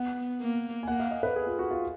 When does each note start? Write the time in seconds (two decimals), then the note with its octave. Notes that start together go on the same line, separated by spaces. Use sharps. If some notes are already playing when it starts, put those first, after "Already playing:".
Already playing: B3 F#5
0.40 A#3
0.83 G#5
0.87 A#3 F#5
1.00 F5
1.11 D#5
1.23 B4
1.36 G#4
1.47 F4
1.59 F#4
1.71 F4